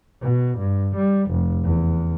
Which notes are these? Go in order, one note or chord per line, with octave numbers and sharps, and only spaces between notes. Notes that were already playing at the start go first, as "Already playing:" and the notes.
B2
G2
G3
F1
E2